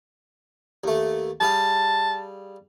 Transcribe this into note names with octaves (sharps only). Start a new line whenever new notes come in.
D#2 A3
G3 G#4 F5 A5